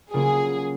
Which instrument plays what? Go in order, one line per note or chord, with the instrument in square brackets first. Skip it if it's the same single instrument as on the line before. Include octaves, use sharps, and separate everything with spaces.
[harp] C#3 F#3 A#3 F4 [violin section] G#4